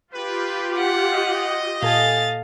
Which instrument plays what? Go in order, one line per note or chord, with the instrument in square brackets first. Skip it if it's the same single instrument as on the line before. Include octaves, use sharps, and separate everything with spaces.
[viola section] F4 G4 [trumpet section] B4
[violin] F#5
[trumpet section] D#5
[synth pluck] A#2 A4 G#5 [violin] F5 A6